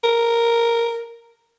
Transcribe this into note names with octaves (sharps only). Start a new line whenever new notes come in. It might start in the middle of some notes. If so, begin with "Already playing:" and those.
A#4